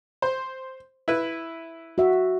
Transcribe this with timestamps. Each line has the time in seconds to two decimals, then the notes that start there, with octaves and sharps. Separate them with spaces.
0.22 C5
1.08 E4 B4
1.98 F#4 E5